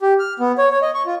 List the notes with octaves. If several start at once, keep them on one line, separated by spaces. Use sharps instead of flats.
G4
F6
B3
C#5
C#5
D#5
C#6
F4